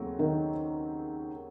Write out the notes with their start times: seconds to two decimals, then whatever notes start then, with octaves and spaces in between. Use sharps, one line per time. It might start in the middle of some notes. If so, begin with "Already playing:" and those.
Already playing: D#2 C#3 F#3 A3 C4
0.19 D#3